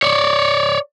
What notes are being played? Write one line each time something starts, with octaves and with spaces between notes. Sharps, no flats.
C#5 D5